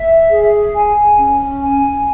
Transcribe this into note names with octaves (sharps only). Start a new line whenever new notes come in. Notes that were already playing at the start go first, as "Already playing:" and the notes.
Already playing: E5
G#4
G#5
C#4
G#5